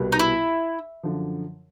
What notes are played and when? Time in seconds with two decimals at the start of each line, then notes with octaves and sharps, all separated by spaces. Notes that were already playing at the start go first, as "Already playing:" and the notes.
Already playing: C2 B2 G3 B3
0.12 D#4
0.19 E4
1.03 F#2 D3 F3